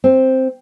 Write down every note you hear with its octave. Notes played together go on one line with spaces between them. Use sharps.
C4